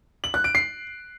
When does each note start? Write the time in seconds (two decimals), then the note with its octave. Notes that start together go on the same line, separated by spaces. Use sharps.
0.24 F#7
0.34 F#6
0.44 D7
0.55 C7